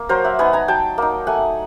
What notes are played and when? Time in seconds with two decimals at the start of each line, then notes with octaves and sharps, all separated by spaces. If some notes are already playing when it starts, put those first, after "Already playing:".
Already playing: A#3
0.09 F#3 A#4 C5
0.24 E5 F#5
0.39 B3 D#4 F#5 G#5
0.53 G#5 A#5
0.68 F#3 G5 A5
0.98 A#3 D#4
1.27 A3 F#5 G#5